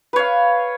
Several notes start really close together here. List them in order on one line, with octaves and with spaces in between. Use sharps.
B4 C#5 F5